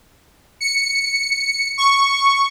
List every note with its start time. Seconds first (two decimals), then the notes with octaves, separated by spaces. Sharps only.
0.61 C#7
1.78 C#6